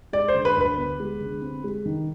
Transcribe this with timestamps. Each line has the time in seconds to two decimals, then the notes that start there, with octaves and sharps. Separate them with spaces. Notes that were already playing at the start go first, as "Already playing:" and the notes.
0.13 G#3 D5
0.28 C5
0.34 D3
0.45 B4
0.56 D2 B4
0.77 B3
1.00 G#3
1.21 D3
1.42 C4
1.64 G#3
1.86 D#3